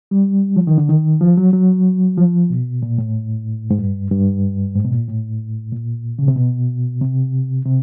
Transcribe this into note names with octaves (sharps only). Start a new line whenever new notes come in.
G3
F3
D#3
D3
D#3
F3
F#3
F#3
F3
B2
A#2
A2
G#2
G2
G2
G#2
B2
A#2
A2
A#2
C#3
C3
B2
C3
C3